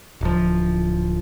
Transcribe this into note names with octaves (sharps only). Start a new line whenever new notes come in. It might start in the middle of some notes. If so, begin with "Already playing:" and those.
D1 F3